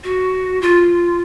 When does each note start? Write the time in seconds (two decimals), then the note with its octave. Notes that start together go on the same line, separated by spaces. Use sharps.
0.04 F#4
0.61 F4